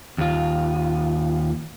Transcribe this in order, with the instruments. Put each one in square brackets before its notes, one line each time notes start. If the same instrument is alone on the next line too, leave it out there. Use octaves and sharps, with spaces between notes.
[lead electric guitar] D#2 F4